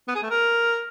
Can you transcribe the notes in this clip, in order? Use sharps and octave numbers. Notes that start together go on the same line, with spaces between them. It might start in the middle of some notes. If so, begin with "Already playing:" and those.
B3
G#4
A3
A#4